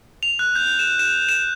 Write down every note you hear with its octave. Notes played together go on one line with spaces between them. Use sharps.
F7
F#6
G6
E7
E7
E7